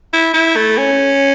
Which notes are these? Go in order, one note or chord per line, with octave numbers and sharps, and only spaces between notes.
E4
E4
A3
C#4